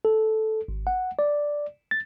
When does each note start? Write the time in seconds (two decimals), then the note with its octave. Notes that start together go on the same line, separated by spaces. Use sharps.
0.05 A4
0.68 G#1
0.87 F#5
1.19 D5
1.91 A6